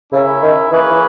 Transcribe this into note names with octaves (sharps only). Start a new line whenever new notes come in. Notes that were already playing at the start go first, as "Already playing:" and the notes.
C#3 C#4 E4 A#4 E5
D#3
E3 A#3 C#4 G#4 B4
E3